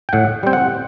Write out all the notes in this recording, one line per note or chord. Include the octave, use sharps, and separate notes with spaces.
G5
A2 F#5
G3 C4 G5
F#5